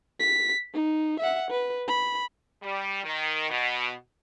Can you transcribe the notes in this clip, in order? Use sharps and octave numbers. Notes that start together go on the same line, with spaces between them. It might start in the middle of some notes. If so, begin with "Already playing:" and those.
B6
D#4
E5 F#5
B4
B5
G3
D#3
B2